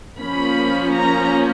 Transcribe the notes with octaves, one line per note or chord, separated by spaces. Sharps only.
F3 A#3 C#4 B5
A#5